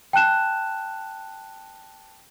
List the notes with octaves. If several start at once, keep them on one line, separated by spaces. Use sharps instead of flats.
G5 A5 F#6 E7